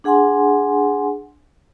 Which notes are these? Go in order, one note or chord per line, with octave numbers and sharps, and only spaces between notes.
D4 G#4 F#5 G#5 C6